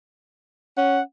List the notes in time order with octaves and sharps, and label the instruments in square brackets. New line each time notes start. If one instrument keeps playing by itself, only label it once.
[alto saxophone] C#4 [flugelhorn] F#5